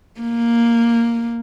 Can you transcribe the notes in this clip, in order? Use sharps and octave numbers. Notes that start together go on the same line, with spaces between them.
A#3